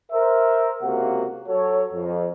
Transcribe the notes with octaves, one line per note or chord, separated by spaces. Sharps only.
A#4 C5 E5
C#2 C3 A#3 F#4 F#5
F#3 F#4 A4 C#5
F2